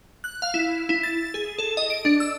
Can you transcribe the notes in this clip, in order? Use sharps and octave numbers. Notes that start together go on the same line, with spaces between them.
F#6
F5
E4
E4
A6
G#4
A4
D#5
D7
D4
E6